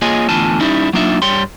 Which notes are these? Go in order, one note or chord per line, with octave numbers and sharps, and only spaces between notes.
A#3 F4 G#4 C#5 D#5 G#5
E2 A2 D3 F4 G#5 A5
G3 C#4 D#4 E4
F#3 A#3 D4 D#4 F4 E5
G2 G3 C#5 G5 C6